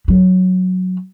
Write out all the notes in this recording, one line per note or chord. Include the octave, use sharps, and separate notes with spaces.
F#3